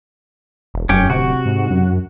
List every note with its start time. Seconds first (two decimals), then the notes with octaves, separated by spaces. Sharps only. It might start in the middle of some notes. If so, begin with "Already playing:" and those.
0.74 E1
0.89 F1 F#2 C#4 G4
1.10 D1 C3 F#4
1.46 G#2
1.70 F#2